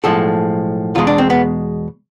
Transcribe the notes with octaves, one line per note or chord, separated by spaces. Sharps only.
B1 A2 F3 G#3 A4
E2 B2 G#3 F4
D4
C4
B3